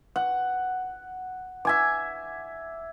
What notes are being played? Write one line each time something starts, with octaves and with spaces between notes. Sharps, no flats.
F#5
E5 G#5 D6